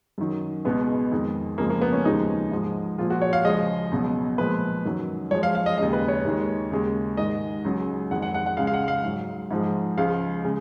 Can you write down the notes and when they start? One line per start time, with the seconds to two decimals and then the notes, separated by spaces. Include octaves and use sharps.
0.18 F#2 D#3 F#3
0.65 C#2 B2 G#3 B3
1.11 F2 D#3 G#3
1.58 F2 C#3 F3 G#3 A#3
1.70 A#3
1.82 B3
1.93 C#4
2.05 D#2 C#3 F3 G#3 D#4
2.51 G#2 F3 G#3
2.98 A#2 F3 G#3 F4
3.10 F#4
3.22 C#5
3.33 F5
3.44 C#2 C#3 F3 G#3 D#5
3.91 C#2 B2 F#3
4.38 A#2 F3 G#3 B4
4.85 F#2 D#3 F#3
5.31 F#2 F3 G#3 C#5
5.43 F5
5.55 F5
5.66 D#5
5.78 D#2 C#3 G#3 D#5
5.93 B4
6.08 C#5
6.24 D#2 D#3 G#3
6.71 D#2 C#3 G#3
7.17 G#2 D#3 G#3 D#5
7.64 C#2 C#3 F#3
8.11 F2 D#3 G#3 F#5
8.22 F#5
8.34 F#5
8.46 F#5
8.57 C#2 C#3 G#3 F5
8.67 F5
8.74 F#5
8.88 F5
9.04 G#2 F#3
9.51 G#2 F3 G#3
9.97 C#2 C#3 F3 G#3 F5
10.45 C#3 G#3